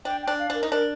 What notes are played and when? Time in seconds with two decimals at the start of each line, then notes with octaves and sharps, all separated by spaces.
0.05 D4 G5
0.22 G5
0.27 D4
0.39 F5
0.50 D4 A#4
0.63 D#4
0.72 D4 A#4